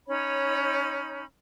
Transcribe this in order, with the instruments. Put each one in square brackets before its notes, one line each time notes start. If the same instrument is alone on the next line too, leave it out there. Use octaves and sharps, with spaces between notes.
[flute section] C#4 D#4 C#5 B5